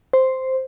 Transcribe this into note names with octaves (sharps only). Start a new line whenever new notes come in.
C5